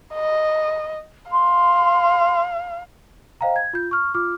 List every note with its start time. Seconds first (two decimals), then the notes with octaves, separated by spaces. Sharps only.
0.15 D#5
1.31 F5 C6
3.41 C5 D#5 F5 G5 A#5
3.56 G#6
3.73 F4 G6
3.91 C#6 F6
4.14 F4 D6 F6